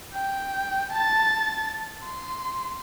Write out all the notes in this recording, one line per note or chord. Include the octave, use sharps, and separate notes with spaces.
G5
A5 A6
C6